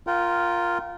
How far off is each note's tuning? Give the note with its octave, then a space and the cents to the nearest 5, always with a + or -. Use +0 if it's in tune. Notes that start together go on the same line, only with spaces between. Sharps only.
F4 +0 A#4 +0 G5 -35